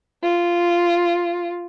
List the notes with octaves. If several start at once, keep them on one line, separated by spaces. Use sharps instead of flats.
F4